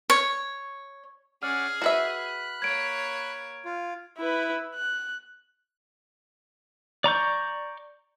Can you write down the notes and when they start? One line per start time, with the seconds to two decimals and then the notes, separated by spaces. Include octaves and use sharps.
0.10 C#5
1.43 C#4 G#4 D5 F#5 F6
1.82 F#4 B4 E5 B5 F#6
2.62 A#3 C#5 G#6 D7
3.65 F4
4.18 E4 B4
4.75 F#6
7.04 D5 A#5 C#6 G6